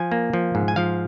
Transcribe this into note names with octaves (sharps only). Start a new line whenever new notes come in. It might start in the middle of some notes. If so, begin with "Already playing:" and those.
Already playing: F3 G#5
A#3
F3
G#2
G#5
F3 F5